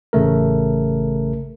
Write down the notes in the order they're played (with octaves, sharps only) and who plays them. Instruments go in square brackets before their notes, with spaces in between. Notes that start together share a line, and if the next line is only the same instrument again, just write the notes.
[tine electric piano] A1 C#3 A3 A#4